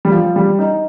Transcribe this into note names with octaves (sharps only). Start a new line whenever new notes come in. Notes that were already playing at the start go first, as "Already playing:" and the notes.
G3
F3
G3
D#4